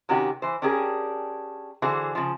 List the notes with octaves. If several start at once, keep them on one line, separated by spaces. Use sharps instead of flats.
C3 D#3 C#4 F#4 G4
E3 C5
C#4 D4 G4 G#4 A#4
D3 E3 F#4 G#4 C5
C#3 F3